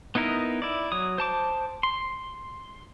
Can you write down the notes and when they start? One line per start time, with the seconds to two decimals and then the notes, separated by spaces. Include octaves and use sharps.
0.15 B3 D#4 E4 A#4 D#5
0.62 E4 D5
0.92 F#3 D#6
1.18 C5 A5 D6
1.83 C6